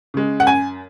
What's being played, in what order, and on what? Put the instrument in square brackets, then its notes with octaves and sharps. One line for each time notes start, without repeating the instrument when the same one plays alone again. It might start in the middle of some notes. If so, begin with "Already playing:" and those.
[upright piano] C#3 G#3
F#5
F#2 G#5